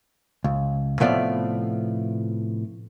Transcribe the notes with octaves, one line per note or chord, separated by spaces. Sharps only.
C#2
A2 C3 F3 A3 B3 D5